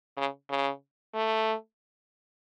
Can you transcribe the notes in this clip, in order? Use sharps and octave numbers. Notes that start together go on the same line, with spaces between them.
C#3
C#3
A3